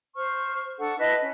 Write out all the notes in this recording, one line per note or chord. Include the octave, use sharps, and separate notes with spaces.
C5 C#6 F6
D4 A4 F#5 C#6
E4 B4 D#5 A5
C#4